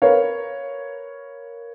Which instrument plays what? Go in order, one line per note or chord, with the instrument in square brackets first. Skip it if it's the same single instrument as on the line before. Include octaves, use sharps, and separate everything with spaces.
[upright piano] A#4 B4 C#5 F5